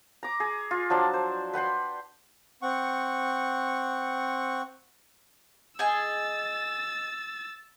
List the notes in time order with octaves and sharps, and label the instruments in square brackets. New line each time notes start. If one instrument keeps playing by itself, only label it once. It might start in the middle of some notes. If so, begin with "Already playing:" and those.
[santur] A#5 D6
G#4
F4
F3 F#3 D4 A5
C5
B4 F#5 G5 C6
[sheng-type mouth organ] C4 F#5 C#6
[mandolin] G#4 D#5 G#5 [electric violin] E6 A6